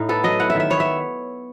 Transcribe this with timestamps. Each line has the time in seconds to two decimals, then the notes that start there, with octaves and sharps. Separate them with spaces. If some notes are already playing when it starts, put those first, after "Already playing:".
Already playing: A2 D#4
0.09 B3 A4
0.24 F#3 D#5
0.39 E4 F#5
0.50 E5
0.55 D#3
0.60 E5
0.70 B3 C#5
0.80 E5